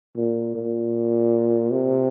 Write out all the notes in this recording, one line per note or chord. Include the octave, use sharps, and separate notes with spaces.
A#2
A#2
C3